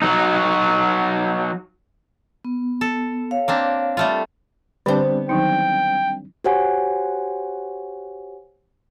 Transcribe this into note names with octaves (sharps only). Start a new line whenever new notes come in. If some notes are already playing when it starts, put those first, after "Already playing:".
F#3 D#4
B3
A4
C#5 F5
A#3 C4 D4
G3 A3 F4
D3 G3 B3 C4 D4 C5 G5
D#3 F#3 D#4 G5
F#4 G4 C5 C#5 F#5 G#5